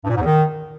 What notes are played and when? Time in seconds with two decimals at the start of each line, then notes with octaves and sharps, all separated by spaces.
0.05 G2
0.10 A#2
0.15 G#2
0.20 E2
0.25 D#3